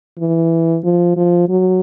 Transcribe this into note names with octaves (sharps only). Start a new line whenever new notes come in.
E3
F3
F3
F#3